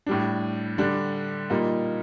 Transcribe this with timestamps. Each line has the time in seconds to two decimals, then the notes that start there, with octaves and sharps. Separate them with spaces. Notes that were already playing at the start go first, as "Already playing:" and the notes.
0.06 A2 G3 D4
0.78 D3 G3 D4
1.50 A#2 G3 A#3 D#4